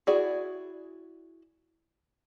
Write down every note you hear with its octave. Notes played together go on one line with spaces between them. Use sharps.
E4 F#4 G#4 D5